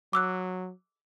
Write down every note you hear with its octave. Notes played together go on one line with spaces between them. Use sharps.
F#3 D6 E6 F#6